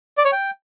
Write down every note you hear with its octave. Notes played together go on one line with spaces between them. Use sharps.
D5
C#5
G5